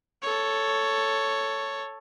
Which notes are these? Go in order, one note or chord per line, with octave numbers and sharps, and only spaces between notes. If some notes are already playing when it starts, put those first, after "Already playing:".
A4 C#5